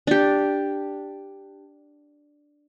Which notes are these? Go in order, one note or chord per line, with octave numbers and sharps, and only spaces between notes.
D4 G4